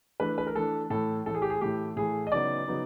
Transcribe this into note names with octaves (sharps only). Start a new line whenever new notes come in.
E3 A3 D4 B4
B4
A#4
E3 A3 D4 A4
A2 E3 A3 A4
A2 E3 A3 A4
G#4
G4
G#4
A2 E3 A3 G4
A2 E3 A3 G#4
D#5
C#3 F#3 B3 D#4 D5
C#3 F#3 B3 D#4